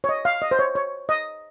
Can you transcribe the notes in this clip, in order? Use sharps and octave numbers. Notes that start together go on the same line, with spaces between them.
C#5
D#5
F5
D#5
C5
C#5
C#5
D#5